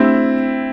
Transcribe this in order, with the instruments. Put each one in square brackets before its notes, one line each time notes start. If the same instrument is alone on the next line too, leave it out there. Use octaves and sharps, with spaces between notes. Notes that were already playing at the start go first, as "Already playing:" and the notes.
Already playing: [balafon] A3 D4 G4 [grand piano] C4 E4